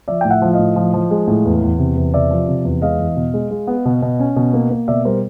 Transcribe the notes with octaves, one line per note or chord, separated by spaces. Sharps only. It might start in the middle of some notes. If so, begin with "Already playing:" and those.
F3 D5 E5
A2 G5
E5 F#5
F3
D#5 F5
A2
F3
F3
G#3
A2
E2
E2
C3
E2
C3 D5 E5
F3
C3
E2
G#3 D#5 F5
E2
B2
G#3
G#3
B3
B2
B2
C#4
B2
A#3
A#3
B2 D5 E5
G3 A#4 C5